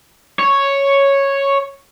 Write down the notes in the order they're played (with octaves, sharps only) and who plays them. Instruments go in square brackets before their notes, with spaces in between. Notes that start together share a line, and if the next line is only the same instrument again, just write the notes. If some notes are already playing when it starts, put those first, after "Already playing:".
[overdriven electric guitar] C#5